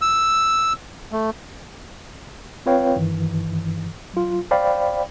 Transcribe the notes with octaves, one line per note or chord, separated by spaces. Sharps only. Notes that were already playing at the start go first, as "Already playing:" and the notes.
E6
A3
C4 F4 B4 C#5 F5 G5
G2 D#3 E3
F#3 F4
C5 D5 F5 G5 B5